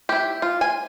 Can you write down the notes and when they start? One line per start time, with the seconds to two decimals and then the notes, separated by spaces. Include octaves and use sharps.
0.09 E4 G4
0.42 F4
0.61 G#5